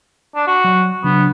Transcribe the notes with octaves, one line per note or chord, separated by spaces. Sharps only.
D4
F#4
F#3
C#3 F#3 B3 D4